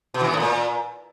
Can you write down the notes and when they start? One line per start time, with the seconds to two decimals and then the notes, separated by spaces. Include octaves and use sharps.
0.14 B2
0.21 E3
0.27 B3
0.34 A2
0.40 A#2